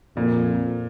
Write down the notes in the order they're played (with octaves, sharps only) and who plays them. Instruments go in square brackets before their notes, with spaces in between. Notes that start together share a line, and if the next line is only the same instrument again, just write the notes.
[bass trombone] F2 [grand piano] A#2